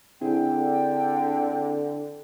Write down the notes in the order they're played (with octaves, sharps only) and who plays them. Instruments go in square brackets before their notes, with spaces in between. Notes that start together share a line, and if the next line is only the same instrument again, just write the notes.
[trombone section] D3 [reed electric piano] C4 E4 G#4 [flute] G5